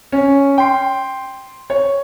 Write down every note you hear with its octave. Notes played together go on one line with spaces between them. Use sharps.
C#4
G5 C6
C#5